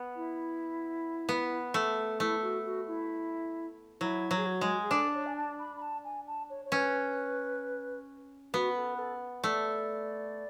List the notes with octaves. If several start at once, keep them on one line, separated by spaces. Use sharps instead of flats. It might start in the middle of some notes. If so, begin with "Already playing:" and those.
Already playing: B3
E4
B3
A3
A3 E4
F#4
F#4
E4
F#3 E4
F#3
G#4
F#4
G#3
G#4
D4 A4
C#5
G#5
A5
B5
B5
A5
G#5
A5
C#5
C#5
C#4 B4
B3 F#4
A4
B4
A4
A3 D5